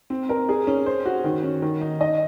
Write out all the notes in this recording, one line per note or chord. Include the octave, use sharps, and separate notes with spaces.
C4
A#4
G#4
C#4
C5
F#4
D#3
C#4
D#3
D#4
D#5